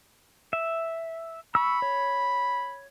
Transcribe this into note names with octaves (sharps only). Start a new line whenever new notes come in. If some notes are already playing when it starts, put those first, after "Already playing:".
E5
B5 C#6 E6
C#5